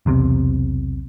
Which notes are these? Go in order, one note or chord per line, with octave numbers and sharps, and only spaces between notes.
B1 E2 C3